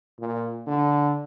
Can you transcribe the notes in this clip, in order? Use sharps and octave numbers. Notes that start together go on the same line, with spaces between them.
A#2
D3